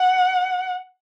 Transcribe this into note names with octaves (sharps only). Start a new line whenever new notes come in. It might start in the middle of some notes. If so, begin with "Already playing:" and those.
Already playing: F#5